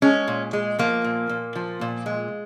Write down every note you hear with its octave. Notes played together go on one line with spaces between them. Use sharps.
G#3 C#4
A#2
G#3
F3 A#3
A#2
A#2
F3
A#2
G#3